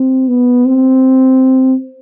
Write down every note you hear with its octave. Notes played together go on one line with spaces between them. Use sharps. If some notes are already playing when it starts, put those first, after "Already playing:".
Already playing: C4
B3
C4